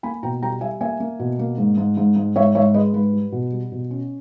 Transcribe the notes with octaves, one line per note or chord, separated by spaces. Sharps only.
A#3 G#5 B5
B2 G5 A#5
G3 G5 A#5
G3 E5 G#5
A#3 E5 G#5
A#3
B2
A#3
G#2
G#2
G#2
G#2
G#2 C#5 E5
G#2 C#5 E5
G#3 B4 D#5
G#2 B4
G3
B2
G3
B2
C#4